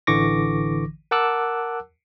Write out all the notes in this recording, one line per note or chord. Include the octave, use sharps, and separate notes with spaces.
A1 D3 E3 C#6 D6 A#6
A#4 F#5 A5 D6 E6 F#6